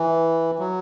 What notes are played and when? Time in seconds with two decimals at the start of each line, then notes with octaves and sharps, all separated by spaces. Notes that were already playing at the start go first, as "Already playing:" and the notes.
Already playing: E3
0.59 F#3